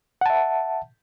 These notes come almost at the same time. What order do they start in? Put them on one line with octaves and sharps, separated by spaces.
F#5 A5 E5